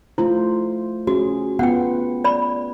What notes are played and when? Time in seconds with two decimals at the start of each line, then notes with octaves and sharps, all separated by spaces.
0.18 A3 E4 F4 C5
1.07 C#4 F#4 G#4
1.59 B3 F4 F#5 G5
2.24 D5 B5